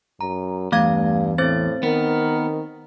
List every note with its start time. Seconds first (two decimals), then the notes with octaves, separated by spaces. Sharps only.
0.21 F#2 A#5
0.72 E2 G2 A3 F5 G#6
1.38 A2 C4 C5 A6
1.83 D#3 B3 A#4